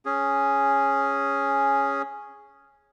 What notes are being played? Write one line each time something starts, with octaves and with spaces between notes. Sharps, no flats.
C#4 G#4